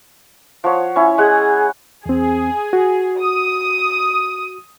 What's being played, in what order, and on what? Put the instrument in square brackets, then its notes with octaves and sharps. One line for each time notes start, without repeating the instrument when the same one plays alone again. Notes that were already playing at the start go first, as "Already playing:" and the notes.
[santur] F3 C#5 [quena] F#5
[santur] C#4 E4
[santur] G#3 F#5 [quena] G#4
[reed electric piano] E2 C4 [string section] G#4
[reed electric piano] F#4
[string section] D#6